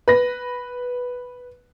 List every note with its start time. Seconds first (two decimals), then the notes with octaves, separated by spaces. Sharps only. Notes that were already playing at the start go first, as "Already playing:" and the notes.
0.08 B4 A#6